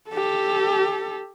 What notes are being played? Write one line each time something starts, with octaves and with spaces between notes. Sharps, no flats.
G4 A4